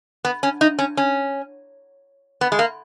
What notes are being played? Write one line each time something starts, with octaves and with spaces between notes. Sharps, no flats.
B3
C#4
D#4
C#4
C#4
B3
G#3
A#3